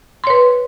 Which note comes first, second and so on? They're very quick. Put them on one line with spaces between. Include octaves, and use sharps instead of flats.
C6 C#5 B4